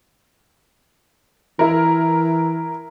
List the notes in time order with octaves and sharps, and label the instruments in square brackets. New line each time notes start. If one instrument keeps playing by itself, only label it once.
[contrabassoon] E3 [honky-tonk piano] E4 A#4